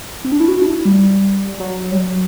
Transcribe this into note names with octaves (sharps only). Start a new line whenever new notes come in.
C4
D4
E4
F#4
D4
E4
G3
F#3
G3
F#3